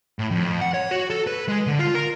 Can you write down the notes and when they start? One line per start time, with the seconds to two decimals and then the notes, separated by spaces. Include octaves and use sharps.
0.19 A2
0.31 F2
0.61 F#5
0.74 C#5
0.91 F#4
1.10 A4
1.27 B4
1.48 G#3
1.67 D3
1.79 F4
1.95 A#4